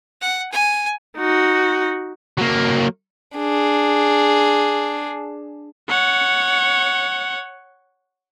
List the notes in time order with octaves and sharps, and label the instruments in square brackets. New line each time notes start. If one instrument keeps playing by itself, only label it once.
[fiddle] F#5
G#5
[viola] D#4 F#4
[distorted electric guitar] F#3 A#3
[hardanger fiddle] D4 G#4
[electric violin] C#5 F#5